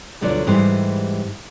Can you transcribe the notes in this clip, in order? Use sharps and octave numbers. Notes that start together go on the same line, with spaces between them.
D2 B2 D3 F#3 F4 D5
G#2 E3 G3 G4 C5